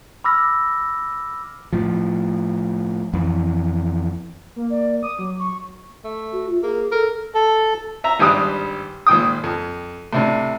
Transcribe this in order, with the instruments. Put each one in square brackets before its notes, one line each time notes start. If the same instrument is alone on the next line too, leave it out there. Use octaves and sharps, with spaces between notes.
[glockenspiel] B5 D6 E6 F6 A#6
[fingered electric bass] A2 F3
F2 E3
[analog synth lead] A#3
[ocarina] D5
[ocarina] D6 [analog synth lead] D#6
[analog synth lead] F#3
[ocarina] C#6
[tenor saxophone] A3
[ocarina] F#4
F4
[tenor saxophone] A#3 [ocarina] G#4
[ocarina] A4 [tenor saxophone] A#4
[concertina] A4
[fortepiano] E5 A#5
G#1 G2 G3 G4 D#6 F#6
G#1 A#2 G5 D#6
F2
A2 C3 D4